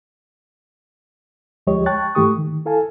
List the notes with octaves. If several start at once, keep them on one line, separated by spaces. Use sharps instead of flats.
D2 F3 G#3 G4 C#5 D#5
G5 A5 C#6 F#6 A6
G#2 E3 A3 G4 C#6 D#6
D#3
E4 A4 F5 G#5 A5